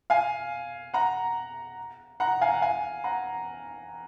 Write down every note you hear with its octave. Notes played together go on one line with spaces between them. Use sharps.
F5 G#5
F#5 A#5
F#5 A#5
F5 G#5
F#5
F5 G#5
F#5 A#5